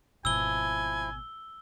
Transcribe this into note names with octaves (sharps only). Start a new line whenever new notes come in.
G#1 B2 F3 E4 G#5 E6 G7